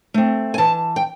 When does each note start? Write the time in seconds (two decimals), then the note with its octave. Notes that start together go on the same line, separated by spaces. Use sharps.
0.14 A3 C4
0.54 G#5
0.58 E3 A5
0.96 G5